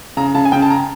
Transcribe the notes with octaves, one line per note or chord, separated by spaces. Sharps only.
C#3 A#5
C#3 A5
G#5
C#3 G5
A5
A#5